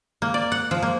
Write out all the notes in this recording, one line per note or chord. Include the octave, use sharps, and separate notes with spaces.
A#3
D5
F#5
F3
A#3